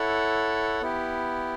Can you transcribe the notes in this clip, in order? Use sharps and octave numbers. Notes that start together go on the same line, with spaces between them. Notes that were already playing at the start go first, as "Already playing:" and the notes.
Already playing: E4 A4 C#5 F#5
B3 E4 G4